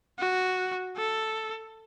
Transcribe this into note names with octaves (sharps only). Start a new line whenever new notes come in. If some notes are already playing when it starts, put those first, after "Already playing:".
F#4
A4